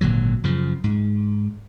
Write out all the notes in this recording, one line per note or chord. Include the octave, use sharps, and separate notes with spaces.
G#1 A#2 D3 F#3
F#2 C#3 F3
G#2